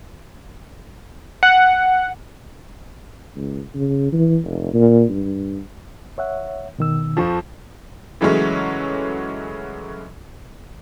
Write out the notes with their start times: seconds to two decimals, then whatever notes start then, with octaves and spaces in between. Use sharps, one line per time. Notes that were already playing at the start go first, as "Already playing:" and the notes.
1.43 F#5
3.36 C#2
3.75 C#3
4.12 E3
4.44 F1
4.74 A#2
5.09 G2
6.18 C#5 E5 F#5
6.78 B2 D#3 E6
7.17 F2 F3 A5 C#6
8.21 C#3 E3 F#3 G#3 A3 C#4